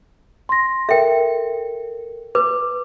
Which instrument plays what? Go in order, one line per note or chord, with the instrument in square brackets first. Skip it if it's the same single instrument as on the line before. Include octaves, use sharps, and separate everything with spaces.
[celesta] C6 A#6
[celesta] A4 A#4 [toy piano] E5 G5
[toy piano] B4 [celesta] D6